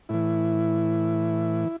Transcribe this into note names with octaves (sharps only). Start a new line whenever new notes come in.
A2 E3 E4